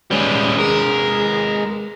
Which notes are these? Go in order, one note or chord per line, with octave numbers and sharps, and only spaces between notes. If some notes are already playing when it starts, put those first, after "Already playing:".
G3 G#3 C#4 B4
G#4 A#4